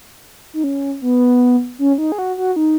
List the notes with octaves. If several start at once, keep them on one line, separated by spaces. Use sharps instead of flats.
D#4
C#4
B3
C#4
D#4
G#4
F#4
F#4
D#4